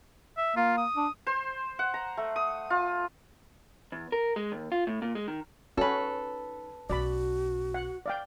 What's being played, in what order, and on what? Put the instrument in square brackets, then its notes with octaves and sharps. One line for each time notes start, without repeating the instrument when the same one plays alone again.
[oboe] E5
[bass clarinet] A#3 [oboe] F4
[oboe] D#6
[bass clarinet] D4
[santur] C5
F#5
A#5
A3
D#6
F4
[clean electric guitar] E2
A#4
G#3
D#2
F4
A2
A#2
G#3
D#3
[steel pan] C#4 F#4 [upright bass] D#4 [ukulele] A4 B4
[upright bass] B1 C#4 [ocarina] F#4 [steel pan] D5 B5
[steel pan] F#5
D5 F5 G5